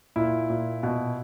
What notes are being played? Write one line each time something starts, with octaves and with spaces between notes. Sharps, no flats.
A#2 E4
A#2
B2